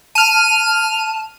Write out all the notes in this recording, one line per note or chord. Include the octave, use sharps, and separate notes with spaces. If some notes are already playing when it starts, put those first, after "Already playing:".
A5 F6 D#7